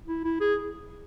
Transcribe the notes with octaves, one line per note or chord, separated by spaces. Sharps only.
E4
E4
G#4